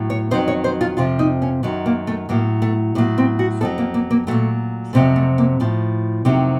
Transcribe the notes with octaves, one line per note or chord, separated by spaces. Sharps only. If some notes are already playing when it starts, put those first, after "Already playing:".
Already playing: A2 F#3
C#5
F2 D#3 F#3 C5
C#5
C5
F4
F2 C3 F3 F4
D#4
C#4
F#2 D#3 F#3
A#3
A3
A2 F#3 A#3
A3
A2 F#3 A#3
C4
F#4
F2 D#3 F#3 A4
A#3
A#3
A#3
A#2 F#3 A3
F2 C3 D#3 F#3 A3
A3
A#3
A2 F3
F2 C3 D#3 F#3